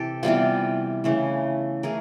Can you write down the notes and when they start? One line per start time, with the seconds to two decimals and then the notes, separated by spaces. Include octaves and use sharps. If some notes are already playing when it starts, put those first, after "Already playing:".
Already playing: C3 E3 G4 A4
0.23 C3 E3 G3 B3 F4
1.04 C#3 E3 A3
1.83 E3 A3 G#4 A#4